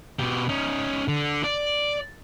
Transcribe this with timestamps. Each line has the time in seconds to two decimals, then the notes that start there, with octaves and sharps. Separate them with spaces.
0.19 B2 G4
0.49 C#4 D#4
1.08 D3
1.44 D5